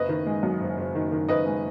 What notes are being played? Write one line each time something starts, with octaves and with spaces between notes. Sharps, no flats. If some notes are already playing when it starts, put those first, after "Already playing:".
Already playing: F#1 B4 D#5
D#3
G#3
F#2
F#1
F#1
D#3
D#3
F#1 B4 D#5
G#3